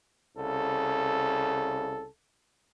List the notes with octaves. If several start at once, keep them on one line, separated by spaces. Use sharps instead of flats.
C2 C#3 A4